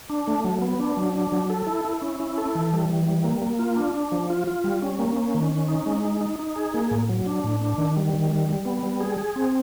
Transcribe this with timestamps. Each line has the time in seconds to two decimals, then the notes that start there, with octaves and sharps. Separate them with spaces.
0.10 D4
0.27 A3
0.44 F#3
0.62 B3
0.80 D4
0.97 F#3
1.16 D4
1.32 F#3
1.50 A4
1.67 E4
1.85 E4
2.02 C#4
2.20 E4
2.38 A4
2.55 E3
2.73 G3
2.90 E3
3.07 G3
3.24 A#3
3.42 A#3
3.59 F4
3.76 D4
3.94 D4
4.12 F3
4.30 F4
4.47 F4
4.64 G3
4.82 C#4
4.99 A#3
5.17 C#4
5.35 D#3
5.52 C#4
5.68 D#4
5.86 G#3
6.05 D#4
6.21 D#4
6.39 D#4
6.56 G#4
6.74 A#3
6.91 A2
7.09 F#3
7.26 D4
7.44 A2
7.62 D4
7.78 D#3
7.97 G3
8.13 D#3
8.32 G3
8.49 G3
8.65 B3
8.83 G3
9.01 G#4
9.18 G#4
9.36 C4